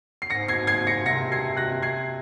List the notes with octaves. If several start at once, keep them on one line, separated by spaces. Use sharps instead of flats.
C7
G#2 A#6 C#7
G#6 C7
G#6 C7
A#6 C#7
C3 A#6 C#7
G#6 C7
F#6 A#6
G#6 C7